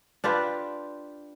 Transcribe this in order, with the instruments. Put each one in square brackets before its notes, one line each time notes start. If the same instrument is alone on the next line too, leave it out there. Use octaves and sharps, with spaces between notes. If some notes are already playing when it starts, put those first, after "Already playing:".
[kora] D4 F4 G4 B4